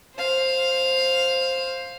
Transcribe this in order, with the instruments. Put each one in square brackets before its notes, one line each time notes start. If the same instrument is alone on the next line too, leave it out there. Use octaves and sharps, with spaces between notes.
[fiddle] C5 F5